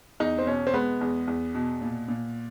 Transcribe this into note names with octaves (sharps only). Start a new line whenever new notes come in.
E2 D#4
C4
B2 C#4
C4
G#3 B3
E2
E2
B2
A#2
A#2